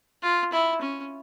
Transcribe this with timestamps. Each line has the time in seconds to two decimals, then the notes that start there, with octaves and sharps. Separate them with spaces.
0.23 F4
0.53 E4
0.81 C#4